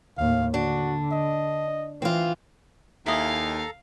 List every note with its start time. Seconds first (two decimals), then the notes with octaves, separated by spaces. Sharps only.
0.18 D#2 A2 F5
0.54 D3 D4 F#4
1.12 D#5
2.02 E3 C4 F4
3.06 D#2 E4 A4 D#5 F5 G#5 A#5